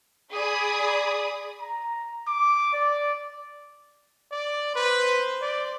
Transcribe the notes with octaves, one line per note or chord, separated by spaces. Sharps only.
G#4 D5 B5 D#6
A#5
D6
D5
D5
B4 C5
D5